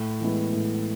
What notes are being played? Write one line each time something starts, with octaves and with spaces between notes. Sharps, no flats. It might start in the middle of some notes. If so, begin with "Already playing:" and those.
Already playing: A2
E3 G#3 B3 E4
A2